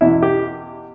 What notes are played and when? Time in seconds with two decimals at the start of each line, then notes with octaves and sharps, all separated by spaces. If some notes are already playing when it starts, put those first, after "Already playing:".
0.01 E2 B2 E4
0.23 G4